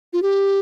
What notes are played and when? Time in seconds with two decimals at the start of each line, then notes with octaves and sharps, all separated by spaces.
0.13 F4
0.23 G4